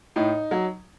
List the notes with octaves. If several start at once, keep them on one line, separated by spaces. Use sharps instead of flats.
A2 D#4
F#3